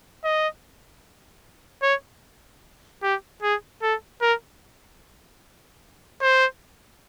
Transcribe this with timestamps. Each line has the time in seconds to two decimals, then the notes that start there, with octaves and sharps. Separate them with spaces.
0.24 D#5
1.82 C#5
3.03 G4
3.43 G#4
3.82 A4
4.21 A#4
6.22 C5